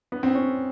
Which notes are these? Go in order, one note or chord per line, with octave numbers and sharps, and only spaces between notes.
B3
C4
C#4